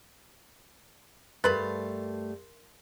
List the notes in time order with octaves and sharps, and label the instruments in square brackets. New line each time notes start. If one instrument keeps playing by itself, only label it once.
[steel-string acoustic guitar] G2 A3 F5 [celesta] A#4 C6 A6 [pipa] B4 B5